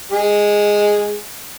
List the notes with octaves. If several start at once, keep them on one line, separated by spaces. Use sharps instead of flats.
G#3 G#4